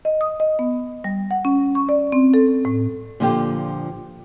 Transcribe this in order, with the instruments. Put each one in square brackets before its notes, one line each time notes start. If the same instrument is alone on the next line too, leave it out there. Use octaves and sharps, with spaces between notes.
[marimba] D#5
D#6
D#5
B3
G3
F#5
C#4
C#6
D5
C4
A4
A2
[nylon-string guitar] A#2 D3 F3 F4 G4